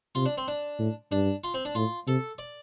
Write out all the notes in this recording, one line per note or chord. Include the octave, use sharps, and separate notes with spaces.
C3 F4
D4
C4
D4
A2
G2 D4
F4
C4
D4
A2 F4
C3 A4
D5